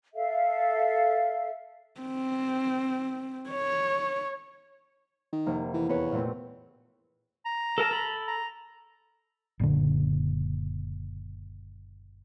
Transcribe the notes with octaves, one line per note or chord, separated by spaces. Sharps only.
A4 E5 F5
C4
C#5
D#3
F1 C3 A#3
E3
E2 B4 C#5
A#2 A3 C4
A#5
A4 A#4 A5
A4 B5
A#5
F#1 A#2 D3